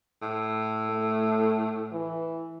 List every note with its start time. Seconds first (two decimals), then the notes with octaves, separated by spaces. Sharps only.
0.22 A2
0.90 A3
1.92 E3